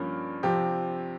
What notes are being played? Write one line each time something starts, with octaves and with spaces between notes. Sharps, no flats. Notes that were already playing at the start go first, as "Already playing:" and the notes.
Already playing: G2 F3 A#3 C#4
C3 F3 C4 G4